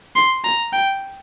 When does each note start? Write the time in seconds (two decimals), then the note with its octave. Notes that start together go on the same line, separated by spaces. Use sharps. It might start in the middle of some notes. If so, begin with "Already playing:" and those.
0.15 C6
0.44 A#5
0.73 G5